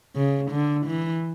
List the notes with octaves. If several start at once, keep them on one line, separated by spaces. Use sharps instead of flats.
C#3
D3
E3